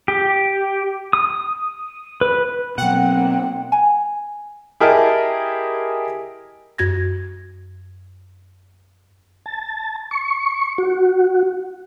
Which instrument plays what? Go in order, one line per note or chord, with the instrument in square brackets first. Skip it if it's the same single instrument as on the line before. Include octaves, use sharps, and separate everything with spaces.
[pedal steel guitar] G4
D#6
B4
[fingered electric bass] B2 F#3 [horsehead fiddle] A#3 C4 [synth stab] F#5 [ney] G5
[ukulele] F#5 G#5 A#5
[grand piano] E4 G4 G#4 A#4 D#5 A5
[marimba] F#2 F#4 G#6 A#6
[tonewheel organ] A5
C#6
F#4